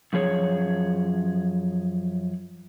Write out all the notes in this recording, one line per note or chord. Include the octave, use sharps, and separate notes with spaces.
F#2 F3 G#4 C#5